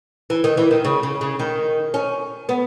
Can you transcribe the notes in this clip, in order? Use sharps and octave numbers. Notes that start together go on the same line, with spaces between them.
E3
D#3
E3
D#3
C#3
C#3
C#3
D#3
C#4
B3